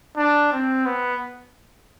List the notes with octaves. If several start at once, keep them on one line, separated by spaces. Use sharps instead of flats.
D4
C4
B3